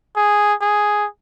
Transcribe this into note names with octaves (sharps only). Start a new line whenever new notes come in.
G#4
G#4